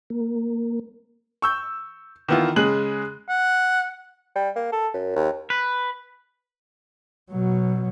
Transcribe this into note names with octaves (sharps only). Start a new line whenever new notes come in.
A#3
C#6 E6 G6
D#3 E3 B3 E4 F4
C#3 G#3 G#4 F#6 F#7
F#5
G3
A#3
A4
F#2
D#2
B4
B2 F#3